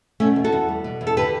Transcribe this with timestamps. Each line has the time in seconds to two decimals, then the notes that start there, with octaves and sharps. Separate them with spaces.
0.20 B2 A3 C#4
0.36 E2
0.44 F#4 A4
0.52 E2
0.68 G3
0.84 B2
1.01 E2
1.07 A4
1.17 D3 G4 B4